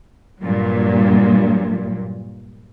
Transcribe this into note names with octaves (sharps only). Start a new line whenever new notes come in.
G2 A#2 F#3